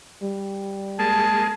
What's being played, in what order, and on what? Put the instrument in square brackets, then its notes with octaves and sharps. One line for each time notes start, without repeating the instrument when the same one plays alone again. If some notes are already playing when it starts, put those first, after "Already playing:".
[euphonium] G3
[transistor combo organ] G#3 A#3 G#4 [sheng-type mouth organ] A5